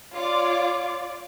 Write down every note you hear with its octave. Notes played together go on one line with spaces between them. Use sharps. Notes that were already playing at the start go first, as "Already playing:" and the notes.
F4 C#5 D5 D6